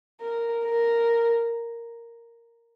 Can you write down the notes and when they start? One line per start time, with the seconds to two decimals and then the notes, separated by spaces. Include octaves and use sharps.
0.21 A#4
0.65 A#4